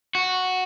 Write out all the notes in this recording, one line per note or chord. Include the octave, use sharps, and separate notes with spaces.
F#4